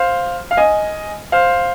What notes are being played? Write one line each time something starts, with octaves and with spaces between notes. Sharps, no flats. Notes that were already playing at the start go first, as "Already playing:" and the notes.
Already playing: C5 F5
F5
D#5 G#5
C5 F5